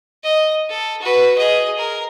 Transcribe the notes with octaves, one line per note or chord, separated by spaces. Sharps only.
D#5
A4
F#4 B4
G#4 D#5
A#4